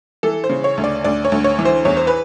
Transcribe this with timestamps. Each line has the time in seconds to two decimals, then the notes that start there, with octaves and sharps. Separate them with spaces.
0.23 E3 A4
0.44 C5
0.49 C#3
0.64 C#5
0.77 D2
0.84 D5
1.04 D2 D5
1.25 C#5
1.32 D2
1.44 C#5
1.59 E3
1.65 C5
1.85 E2 C#5
1.97 C5
2.07 B4